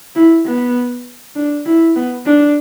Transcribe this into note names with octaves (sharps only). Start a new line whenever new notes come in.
E4
B3
D4
E4
B3
D4